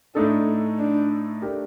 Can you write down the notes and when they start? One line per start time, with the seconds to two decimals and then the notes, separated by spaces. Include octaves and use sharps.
0.15 A2 A3 D4 D#4 A4
0.78 D4
1.42 A3 D4 G4 A#4